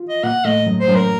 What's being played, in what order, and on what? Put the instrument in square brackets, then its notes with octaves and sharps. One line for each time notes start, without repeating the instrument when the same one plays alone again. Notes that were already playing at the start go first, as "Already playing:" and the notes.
Already playing: [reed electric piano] F4
[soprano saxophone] D#5
[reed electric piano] A#2 A#3 [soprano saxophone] F#5
[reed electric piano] A2 A3 [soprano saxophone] D#5
[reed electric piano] F#2 F#3
[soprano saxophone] C5
[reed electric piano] F#2 F#3
[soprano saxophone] A#4